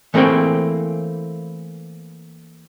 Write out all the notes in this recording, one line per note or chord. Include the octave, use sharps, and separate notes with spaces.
E3 A3 A#3 C4 G#4 G5